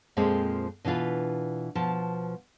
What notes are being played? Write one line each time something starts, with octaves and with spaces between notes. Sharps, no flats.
F2 A#2 F3 G#3 A#3 C4
B2 E3 D4 F4 B4
B2 F3 A5